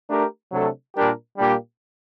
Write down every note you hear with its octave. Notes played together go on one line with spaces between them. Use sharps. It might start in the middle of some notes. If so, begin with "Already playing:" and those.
A3 D4 G4 A#4
C3 F#3 A3 D4 A4
A#2 G3 D4 G4 A#4
A#2 G3 A#3 D4 G4